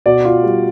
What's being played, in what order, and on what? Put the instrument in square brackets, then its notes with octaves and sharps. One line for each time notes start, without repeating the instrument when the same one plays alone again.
[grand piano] B2 D5
F4
G3